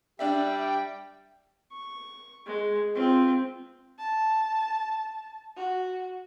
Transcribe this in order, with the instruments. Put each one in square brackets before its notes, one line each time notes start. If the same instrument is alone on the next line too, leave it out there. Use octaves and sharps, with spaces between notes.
[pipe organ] G3 [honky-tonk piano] D4 D5 E5 [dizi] G5
[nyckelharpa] C#6
G#3
C4 F4
[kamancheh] A5
F#4